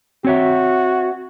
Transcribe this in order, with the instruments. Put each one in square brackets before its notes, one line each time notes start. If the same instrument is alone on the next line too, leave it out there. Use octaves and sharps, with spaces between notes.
[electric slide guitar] C4 C#5 E5 [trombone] F#4